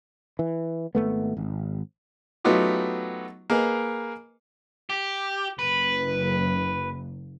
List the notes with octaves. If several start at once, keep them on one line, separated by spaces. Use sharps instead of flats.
E3
G#1 G2 A3 B3
G#1
F#3 A3 B3 D#4 F4 G4
A#3 G#4 A#4 B4 D#5
G4
F#1 B4